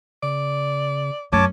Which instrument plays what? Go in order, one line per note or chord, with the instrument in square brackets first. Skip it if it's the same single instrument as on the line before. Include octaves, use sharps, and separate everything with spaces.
[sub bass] C#3 [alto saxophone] D5
[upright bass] F#2 [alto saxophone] C#4 [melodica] C#5 A5 D6